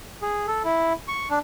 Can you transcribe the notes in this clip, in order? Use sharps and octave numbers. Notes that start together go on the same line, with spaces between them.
G#4
A4
E4
C#6
D4